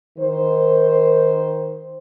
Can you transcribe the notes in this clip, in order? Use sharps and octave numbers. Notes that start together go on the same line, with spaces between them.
D#3 C5